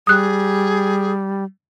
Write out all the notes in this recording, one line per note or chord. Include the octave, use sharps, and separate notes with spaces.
G3 G#4 D#6 F#6